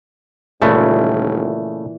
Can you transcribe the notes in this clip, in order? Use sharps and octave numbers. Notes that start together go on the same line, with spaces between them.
D#1 A#2 C#3 E3 G#3 A3